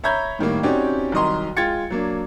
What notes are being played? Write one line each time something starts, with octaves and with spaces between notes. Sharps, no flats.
C#5 E5 A#5 B5 G6 G#6
A2 D#3 G3 A#3
C4 C#4 D#4 F#4 G4 D5
C2 D#3 F#3 D#5 A#5 C6
G#3 F4 G5 G#6 A6 C#7
F#3 A#3 D4